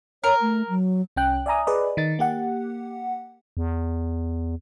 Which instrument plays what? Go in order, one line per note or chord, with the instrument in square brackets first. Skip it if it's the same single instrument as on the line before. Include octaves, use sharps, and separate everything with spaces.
[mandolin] A#4 [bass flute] C#5
[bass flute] A3
F#3
[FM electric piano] C2 C#4 G5 F#6
D5 E5 G#5 A#5 D#6
G#4 B4 D5 D#5
D#3 D#4 A6
A#3 G4 F#5
[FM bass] E2